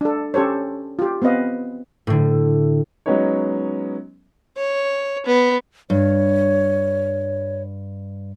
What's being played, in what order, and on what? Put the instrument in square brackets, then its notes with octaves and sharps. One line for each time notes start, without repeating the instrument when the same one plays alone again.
[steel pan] D4 A4
C#4 G4 A4 C5 C#5
F4 G4
B3 C4 B4 D#5 F5
[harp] A2 D3
[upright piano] F#3 G#3 B3 C#4 D#4 C#5
[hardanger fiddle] C#5
B3
[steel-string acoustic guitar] G2 [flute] C#5